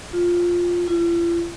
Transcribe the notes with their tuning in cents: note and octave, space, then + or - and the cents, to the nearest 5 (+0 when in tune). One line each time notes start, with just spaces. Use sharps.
F4 +5
F4 -45